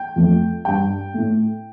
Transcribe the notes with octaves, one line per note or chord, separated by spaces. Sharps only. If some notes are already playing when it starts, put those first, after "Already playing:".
Already playing: G5
F2 F3 A3
G2 G3 G5
A2 A3